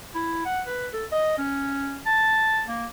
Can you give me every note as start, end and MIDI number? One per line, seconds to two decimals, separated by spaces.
0.15 0.44 64
0.45 0.61 78
0.67 0.87 71
0.93 1.05 69
1.12 1.36 75
1.38 2.00 61
2.06 2.63 81
2.69 2.87 58